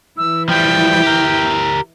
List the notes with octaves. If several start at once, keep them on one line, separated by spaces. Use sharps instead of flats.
E3 E4 E6
F3 G3 G5
G4 A#4